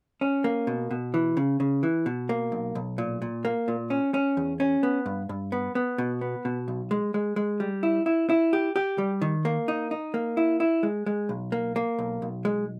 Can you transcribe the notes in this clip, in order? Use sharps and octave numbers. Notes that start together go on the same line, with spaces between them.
C#4
A#3
B2
B2
E3
C#3
C#3
E3
B2
A#3
B1
B1
A#2
A#2
A#3
A#2
C#4
C#4
E2
C#4
B3
G2
G2
B3
B3
B2
B3
B2
B1
G#3
G#3
G#3
G3
E4
E4
E4
G4
G4
G3
D#3
A#3
D#4
D#4
A#3
E4
E4
G#3
G#3
B1
A#3
A#3
B1
B1
G#3